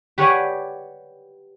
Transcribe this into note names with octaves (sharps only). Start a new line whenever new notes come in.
G4 B4 C#5 D5 F#5 G#5